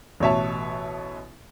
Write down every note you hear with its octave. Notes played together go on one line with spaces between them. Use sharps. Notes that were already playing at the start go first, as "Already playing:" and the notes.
A1 B2 C#5 E5 A5